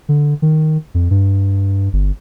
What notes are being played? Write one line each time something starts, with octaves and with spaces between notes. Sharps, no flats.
D3
D#3
F2
G2
G1